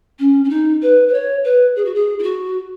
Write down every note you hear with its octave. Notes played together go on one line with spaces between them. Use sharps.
C#4
C#4
D#4
B4
B4
C#5
B4
G#4
F#4
G#4
E4
F#4